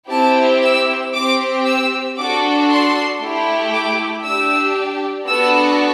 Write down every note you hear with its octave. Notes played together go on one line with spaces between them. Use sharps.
C4 E4 G4 A5
E6
C4 G4 D6
E6
D4 F#4 A4 D6
C6
A3 E4 G4
D6
D4 G4 E6
B3 D4 F#4 A4 E6